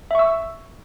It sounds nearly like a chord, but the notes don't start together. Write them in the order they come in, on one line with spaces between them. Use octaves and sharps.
E5 C#6 E6